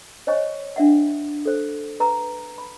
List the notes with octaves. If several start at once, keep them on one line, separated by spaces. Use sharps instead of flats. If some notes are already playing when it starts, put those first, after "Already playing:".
C5 C#5 D#5 G#5 C#6
D4 E5 F#5
A4 C5
B4 A#5
B5